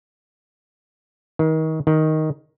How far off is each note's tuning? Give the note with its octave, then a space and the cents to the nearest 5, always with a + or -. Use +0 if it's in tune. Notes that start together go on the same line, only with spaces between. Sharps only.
D#3 +30
D#3 +5